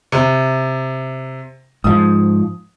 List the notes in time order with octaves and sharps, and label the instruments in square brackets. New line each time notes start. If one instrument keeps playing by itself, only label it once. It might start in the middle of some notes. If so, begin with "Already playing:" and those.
[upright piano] C3
[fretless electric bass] G#2 F3 [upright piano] D#6